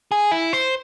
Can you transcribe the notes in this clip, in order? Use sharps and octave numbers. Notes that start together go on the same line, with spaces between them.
G#4
E4
C5